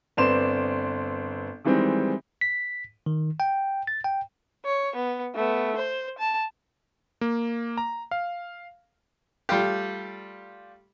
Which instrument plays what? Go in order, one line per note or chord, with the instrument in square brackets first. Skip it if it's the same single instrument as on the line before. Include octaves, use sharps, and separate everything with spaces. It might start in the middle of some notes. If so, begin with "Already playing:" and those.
[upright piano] G1 C4 B4 D5 C6 E7
D#3 E3 G3 G#3 C4
[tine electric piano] B6
D#3
G5
A6
G5
[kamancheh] C#5
B3
A3 B3
C5
A5
[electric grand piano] A#3
A#5
F5
[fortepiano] G3 A3 F4 G4